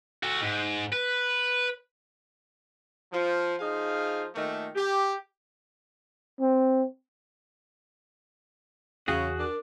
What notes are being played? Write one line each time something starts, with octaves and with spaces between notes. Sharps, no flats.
F#4 A4
G#2
B4
F3
F3 D#4 G#4 F5
A#2 D#3 A3
G4
C4
E2 C#3 F#4 G#4
D4 A#4